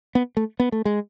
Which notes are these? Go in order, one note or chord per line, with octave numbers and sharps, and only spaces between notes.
B3
A3
B3
A3
G#3